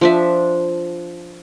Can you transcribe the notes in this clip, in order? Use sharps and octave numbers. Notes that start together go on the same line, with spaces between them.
F3 D4 E5